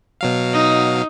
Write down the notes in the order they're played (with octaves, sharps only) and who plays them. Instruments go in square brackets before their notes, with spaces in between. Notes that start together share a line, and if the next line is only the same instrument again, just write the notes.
[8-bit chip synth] B2 F#3 F5
[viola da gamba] D#4